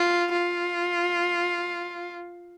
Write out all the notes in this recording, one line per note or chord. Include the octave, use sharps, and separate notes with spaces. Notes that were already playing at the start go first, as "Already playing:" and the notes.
Already playing: F4
F4